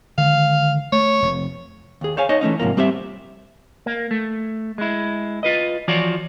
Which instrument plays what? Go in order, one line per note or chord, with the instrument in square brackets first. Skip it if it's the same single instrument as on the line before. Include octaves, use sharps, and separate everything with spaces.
[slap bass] D3 D#3 G#3 [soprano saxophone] F5
[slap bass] A3 [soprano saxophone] C#5
[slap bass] F1 C3
[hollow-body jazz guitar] D#2 G#4
C5 C#5 F5 G#5
D#4 C5 C#5 D#5
E3 A3 C#4 D#4
G#2 C3 F3 A#3
G3 C4 G4 C5 D5 E5
[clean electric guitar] A#3
A3
G#3 E4
F4 B4 D#5
E3 F3 F4 F#4 C#5 D5